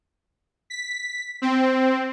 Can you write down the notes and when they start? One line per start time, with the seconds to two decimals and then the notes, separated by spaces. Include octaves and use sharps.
0.70 B6
1.42 C4